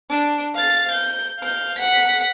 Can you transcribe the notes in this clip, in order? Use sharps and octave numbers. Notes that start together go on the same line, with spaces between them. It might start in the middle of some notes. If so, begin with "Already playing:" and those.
D4
F5 A6
G6
F5 G6
F#5 B6